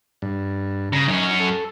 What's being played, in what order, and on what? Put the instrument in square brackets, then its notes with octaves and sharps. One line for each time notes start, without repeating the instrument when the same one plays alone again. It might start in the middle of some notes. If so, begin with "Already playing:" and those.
[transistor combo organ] G2
[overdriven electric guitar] C#3 [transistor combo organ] A#5
[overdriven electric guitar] F#2 C#4 [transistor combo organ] D#4
[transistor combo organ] A4